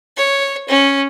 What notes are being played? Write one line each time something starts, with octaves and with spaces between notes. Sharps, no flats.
C#5
C#4